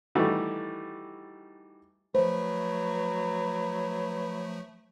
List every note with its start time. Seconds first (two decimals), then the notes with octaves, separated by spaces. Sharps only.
0.15 D#3 E3 G3 A3 F#4
2.15 F3 F#3 A3 B4 C5